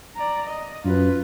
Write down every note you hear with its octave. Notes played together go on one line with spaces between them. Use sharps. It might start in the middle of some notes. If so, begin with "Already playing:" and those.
D5 A#5
D#5
F#2 F4 B4